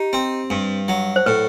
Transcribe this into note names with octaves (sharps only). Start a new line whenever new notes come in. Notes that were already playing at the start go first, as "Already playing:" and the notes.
Already playing: D#4 G4
C4
G2
F#3
C5
A2 B4